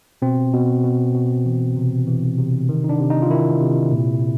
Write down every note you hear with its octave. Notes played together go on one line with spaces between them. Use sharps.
B2 C4
B2
B2
B2
E3
C3
E3
C3
D#3
D#4
D4
C3
D#4
F4
D#3 E4
C3
A#2